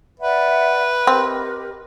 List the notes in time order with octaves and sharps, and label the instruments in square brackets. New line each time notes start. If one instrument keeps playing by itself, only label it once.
[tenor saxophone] B4 [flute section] D5 E5 F#5
[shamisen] C4 [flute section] G4 A#4 D#5